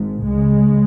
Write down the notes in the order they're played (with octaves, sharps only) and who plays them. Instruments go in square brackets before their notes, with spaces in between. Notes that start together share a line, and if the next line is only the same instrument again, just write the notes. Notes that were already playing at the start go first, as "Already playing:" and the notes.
Already playing: [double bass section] G#1 G#2
C#2 C#3 G#3